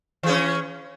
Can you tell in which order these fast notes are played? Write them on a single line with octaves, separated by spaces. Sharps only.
E3 G#4 C#4